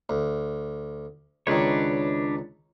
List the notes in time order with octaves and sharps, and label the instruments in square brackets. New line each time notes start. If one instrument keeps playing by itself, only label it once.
[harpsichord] D2
[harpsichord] C#2 D#3 [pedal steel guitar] D4 B4 C#5